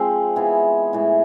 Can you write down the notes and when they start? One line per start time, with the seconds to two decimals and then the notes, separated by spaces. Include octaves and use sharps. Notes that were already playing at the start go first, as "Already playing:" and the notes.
Already playing: F3 G#3 C4
0.36 E3 B3 E4 G#4
0.93 A2 E3 G#3